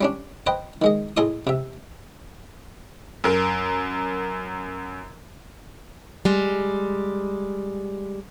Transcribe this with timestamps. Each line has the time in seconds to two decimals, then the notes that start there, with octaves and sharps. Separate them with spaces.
0.01 G3 C#4 D4
0.47 B4 C5 D#5 G5
0.82 D#3 G#3 D#5
1.17 A2 G#4 A4 D#5 C6 D#6
1.47 C3 E5
3.24 F#2 A#4
6.25 G3 G#3